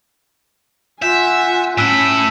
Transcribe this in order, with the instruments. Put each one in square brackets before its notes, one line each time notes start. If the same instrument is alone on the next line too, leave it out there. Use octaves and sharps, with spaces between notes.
[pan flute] F4 [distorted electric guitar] E5 [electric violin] F#5 G#5 [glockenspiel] G6
[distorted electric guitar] A2 E4 [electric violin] C#4 [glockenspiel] E6 F#6 B6